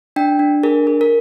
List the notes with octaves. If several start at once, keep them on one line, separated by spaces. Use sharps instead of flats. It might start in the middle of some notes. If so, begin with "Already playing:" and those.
D4 G5
D4
G#4 A#4
G#4
A#4